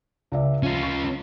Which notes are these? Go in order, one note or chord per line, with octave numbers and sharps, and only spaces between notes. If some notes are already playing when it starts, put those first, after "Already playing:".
C#2 D5 E5
F3 C#4 F4
C#6